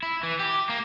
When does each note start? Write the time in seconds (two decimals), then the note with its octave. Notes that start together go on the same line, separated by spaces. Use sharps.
0.03 E4
0.23 E3
0.39 G4
0.69 A#3